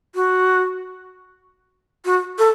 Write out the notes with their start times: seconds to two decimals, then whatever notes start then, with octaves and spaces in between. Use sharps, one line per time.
0.15 F#4
2.05 F#4
2.38 A4